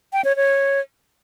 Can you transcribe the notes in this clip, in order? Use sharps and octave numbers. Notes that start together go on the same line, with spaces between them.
G5
C#5
C#5